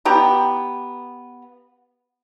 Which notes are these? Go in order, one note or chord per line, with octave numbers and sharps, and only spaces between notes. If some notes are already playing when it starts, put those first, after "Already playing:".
B3 G4 A#5